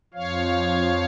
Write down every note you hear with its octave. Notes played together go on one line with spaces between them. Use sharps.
F2 F3 C#5 F5